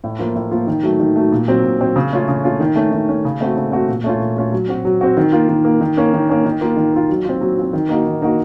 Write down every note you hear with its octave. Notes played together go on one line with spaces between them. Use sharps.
A2
F3 A#3 F4
A2
F3 A#3 F4
D#3
F#3 A3
D#3
F#3 A3
A#2
F#3 C4
A#2
F#3 C4
C#3
A3 C#4 F4
C#3
A3 C#4 F4
D#3
A3 C#4
D#3
A3 C#4
C#3
A3 C4 F#4
C#3
A3 C4 F#4
A#2
A3 C#4 F4
A#2
A3 C#4 F4
F#3
C4 F#4
F#3
C4 F#4
D#3
A#3 F4
D#3
A#3 F4
D#3
A#3 C#4
D#3
A#3 C#4
D#3
A#3 F4
D#3
A#3 F4
F#3
C4 F4
F#3
C4 F4
D#3
A#3 D#4 F#4
D#3
A#3 D#4 F#4